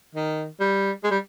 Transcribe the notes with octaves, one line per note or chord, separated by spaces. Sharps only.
D#3
G3
G#3
G3